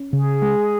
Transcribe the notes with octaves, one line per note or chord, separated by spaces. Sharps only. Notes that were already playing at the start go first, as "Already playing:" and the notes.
Already playing: C#4
C#3 G#4
G#3